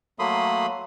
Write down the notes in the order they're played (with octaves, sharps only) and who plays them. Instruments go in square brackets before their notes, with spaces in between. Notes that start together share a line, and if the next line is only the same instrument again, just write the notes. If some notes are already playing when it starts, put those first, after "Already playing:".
[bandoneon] F#3 A3 A#3 B5 C6 D#6